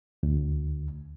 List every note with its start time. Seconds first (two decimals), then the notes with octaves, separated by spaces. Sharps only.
0.23 D2